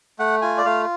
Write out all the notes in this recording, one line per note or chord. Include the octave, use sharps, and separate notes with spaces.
A3 F#5
F4 G#5
D5
A3 F5